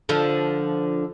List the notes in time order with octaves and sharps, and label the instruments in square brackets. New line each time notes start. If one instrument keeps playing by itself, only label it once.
[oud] D3 F3